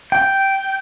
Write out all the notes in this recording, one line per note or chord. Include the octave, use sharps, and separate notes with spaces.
G5